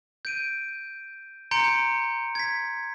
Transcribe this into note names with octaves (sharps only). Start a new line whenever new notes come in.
G6 D7 D#7
A#5 C6 G6 C#7 D7
G#6 B6